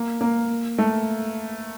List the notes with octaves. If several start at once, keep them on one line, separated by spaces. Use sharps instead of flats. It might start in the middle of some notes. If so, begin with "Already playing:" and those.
Already playing: A#3
A#3
A3